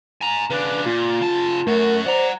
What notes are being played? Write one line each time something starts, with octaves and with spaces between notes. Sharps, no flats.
G#5 A#5
C#3 D4 B4
A#2 F4
C#3 A5
F#2 A3 F#4 A#4
C5 D5 F#5 A#5